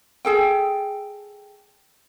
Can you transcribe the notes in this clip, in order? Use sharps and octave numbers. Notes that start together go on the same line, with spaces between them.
G#4 A4 G5